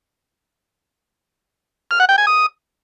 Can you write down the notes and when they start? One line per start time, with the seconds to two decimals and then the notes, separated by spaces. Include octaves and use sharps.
1.91 F6
2.00 F#5
2.09 G5
2.18 G#5
2.27 D#6